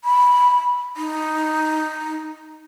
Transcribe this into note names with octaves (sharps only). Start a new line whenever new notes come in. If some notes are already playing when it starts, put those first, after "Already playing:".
B5
D#4